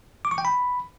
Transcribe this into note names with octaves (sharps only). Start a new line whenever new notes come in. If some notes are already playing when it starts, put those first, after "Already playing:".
D6
C#6
G5
B5